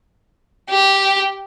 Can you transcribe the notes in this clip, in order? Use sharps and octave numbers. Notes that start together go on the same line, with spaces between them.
G4